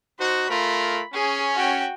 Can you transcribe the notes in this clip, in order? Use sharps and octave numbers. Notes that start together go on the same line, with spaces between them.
D#4 F#4 C5
A3 F4 A#4 B5
C#4 G#4
F#4 G5